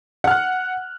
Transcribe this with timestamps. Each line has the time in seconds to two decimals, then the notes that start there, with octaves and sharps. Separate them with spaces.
0.24 F#5
0.27 F6
0.31 F#6